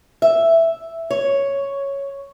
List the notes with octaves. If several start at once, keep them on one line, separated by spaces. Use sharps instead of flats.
E5
C#5